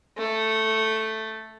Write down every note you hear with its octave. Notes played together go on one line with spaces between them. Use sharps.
A3